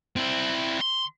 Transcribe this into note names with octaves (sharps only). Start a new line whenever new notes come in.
C4 E4
C6